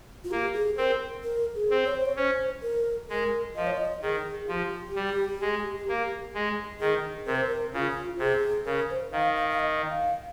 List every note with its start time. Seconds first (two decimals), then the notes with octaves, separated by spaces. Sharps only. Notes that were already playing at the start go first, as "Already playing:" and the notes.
0.24 F4
0.31 A#3 G4
0.54 G#4
0.77 C4 A#4
1.23 A#4
1.55 G#4
1.70 C4
1.85 C#5
1.95 C5
2.05 C#5
2.16 C#4 C5
2.62 A#4
3.09 G#3 A#4
3.55 F3 D#5
3.67 C#5
3.77 D#5
4.02 D#3 G#4
4.48 F3 G4
4.95 G3
5.41 G#3
5.88 A#3
6.35 G#3
6.80 D#3 G#4
7.26 C3 A#4
7.36 C5
7.46 A#4
7.73 C#3 F4
8.19 C3 G#4
8.66 C#3 A#4
8.90 C5
9.12 D#3 F5
9.36 F5
9.50 F5
9.59 D#5
9.89 F5